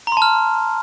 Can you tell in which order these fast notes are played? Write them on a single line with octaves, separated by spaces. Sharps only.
A#5 C6 A5 F6